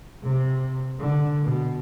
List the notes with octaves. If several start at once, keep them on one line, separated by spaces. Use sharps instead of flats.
C3
D3
B2